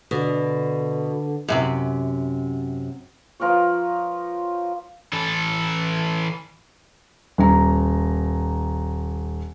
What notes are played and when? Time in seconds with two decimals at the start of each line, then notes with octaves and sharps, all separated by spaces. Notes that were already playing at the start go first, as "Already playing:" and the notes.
0.11 B2 D3
1.48 F#2 A2 C3
3.40 F3 A#4 B4 C#5
5.13 E3 A4
7.38 D#1 A#5